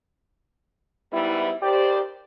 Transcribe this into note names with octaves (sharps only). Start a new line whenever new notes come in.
G#2 G3 B3 E4
D#2 G4 C5 D5